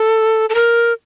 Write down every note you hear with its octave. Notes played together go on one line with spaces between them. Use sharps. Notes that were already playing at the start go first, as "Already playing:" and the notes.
Already playing: A4
A4
A#4